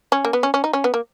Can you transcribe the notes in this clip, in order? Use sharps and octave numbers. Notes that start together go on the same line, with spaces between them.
C#4
A#3
B3
C#4
C#4
D#4
C#4
B3
A#3